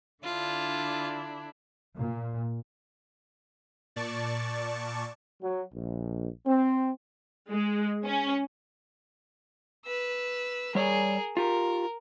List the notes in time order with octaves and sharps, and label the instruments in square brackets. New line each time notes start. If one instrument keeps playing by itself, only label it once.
[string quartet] D3 D4 E4 [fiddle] F4
[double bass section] A#2
[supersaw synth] A#2 D5 A5 C#6
[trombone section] F#3
A#1
C4
[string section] G#3
C#4
[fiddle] B4 E6
[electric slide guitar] G3 C#5 D5 [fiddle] G#4 A#4
[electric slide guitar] F4 G4 [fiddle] A#4